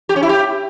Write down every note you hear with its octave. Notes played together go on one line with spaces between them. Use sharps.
G4
C#4
E4
G4